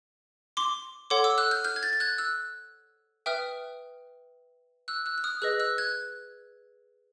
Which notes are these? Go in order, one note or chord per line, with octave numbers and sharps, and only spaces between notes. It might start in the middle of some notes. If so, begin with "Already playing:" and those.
C6 D6
A4 C#5 F#5 C6 D6
D6 E6
E6 F#6
F6 G6
F6 G6
G#6
G6 A6
A6
F#6 G#6
E6 F#6
B4 E5 G5 D#6 F6
E6 F#6
E6 F#6
F#6
D#6 F6
G#4 B4 D#5 E6 F#6
E6 F#6
F#6 G#6